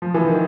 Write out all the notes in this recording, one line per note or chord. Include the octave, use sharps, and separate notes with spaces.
F3
E3
D#3